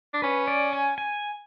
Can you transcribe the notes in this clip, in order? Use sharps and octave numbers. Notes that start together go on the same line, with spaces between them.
D4
C#4 B4
D5
G#5
G#5